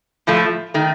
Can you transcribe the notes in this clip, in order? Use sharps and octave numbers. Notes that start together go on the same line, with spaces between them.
A2 F3 A3
D#3 A3